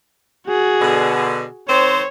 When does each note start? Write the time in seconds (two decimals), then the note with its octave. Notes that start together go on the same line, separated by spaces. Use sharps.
0.47 F#4 G#4
0.80 B2 D3
1.69 D#3 C4 C5 C#5